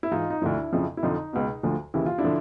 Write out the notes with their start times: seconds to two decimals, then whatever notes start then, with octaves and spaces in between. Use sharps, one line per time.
0.03 E4
0.11 G#2 E3 D#4 F4
0.30 D#4
0.42 D2 D3 F3 D4 E4
0.73 F2 C#3 F3
0.97 E4
1.03 F2 D3 F3 D#4
1.33 C#2 B2
1.63 D2 D3 F3
1.94 D#2 C#3 E3 E4
2.06 F4
2.18 D4 E4
2.24 D3 F3